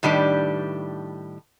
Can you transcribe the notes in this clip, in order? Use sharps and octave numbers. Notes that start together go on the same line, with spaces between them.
A2 D#3 G3 D4 G4 B4